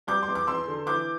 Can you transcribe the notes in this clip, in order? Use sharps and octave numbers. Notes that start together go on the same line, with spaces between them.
G3 D6 G6
C6
E2
D6
E2 C6 E6
D3
E3 D6 G6